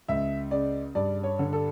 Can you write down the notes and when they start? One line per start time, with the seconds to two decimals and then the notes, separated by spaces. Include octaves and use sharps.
0.08 C#2 E5
0.51 C#3 D5
0.95 G2 D5
1.23 C#5
1.39 D3
1.53 A4